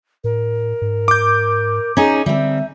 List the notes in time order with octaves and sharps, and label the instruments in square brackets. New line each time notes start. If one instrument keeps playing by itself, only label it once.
[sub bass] A2 [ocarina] A#4
[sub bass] G#2
[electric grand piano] D6 G6
[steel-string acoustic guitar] C#4 D#4 G#4 [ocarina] A#5
[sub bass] D3 [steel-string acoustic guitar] G3 C4 [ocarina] E5